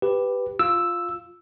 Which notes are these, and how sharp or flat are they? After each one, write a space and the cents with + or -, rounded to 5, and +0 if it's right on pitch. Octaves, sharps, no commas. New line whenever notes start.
G4 +5 B4 +5
F4 +0 E6 +0